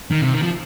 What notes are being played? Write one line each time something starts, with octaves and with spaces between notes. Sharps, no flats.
D#3
C3
D#3
F3